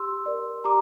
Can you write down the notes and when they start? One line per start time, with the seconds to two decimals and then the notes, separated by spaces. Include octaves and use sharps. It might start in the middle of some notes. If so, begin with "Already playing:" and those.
Already playing: G4 C6 E6
0.26 A#4 D5
0.64 G4 A#5 D6